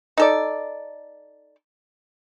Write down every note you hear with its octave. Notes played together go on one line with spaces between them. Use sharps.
D#4 A4 D5